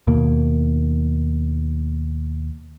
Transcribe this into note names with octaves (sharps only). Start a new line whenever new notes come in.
D#2 B2 A#3